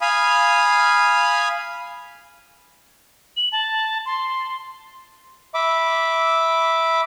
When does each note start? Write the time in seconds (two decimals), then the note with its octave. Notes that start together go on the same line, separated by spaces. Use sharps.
0.01 F5 G#5 B5 D#6
3.37 F#7
3.52 A5
4.06 C6
5.54 E5 B5 D6